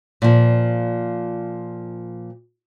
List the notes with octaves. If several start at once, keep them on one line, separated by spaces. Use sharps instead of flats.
A#2 F3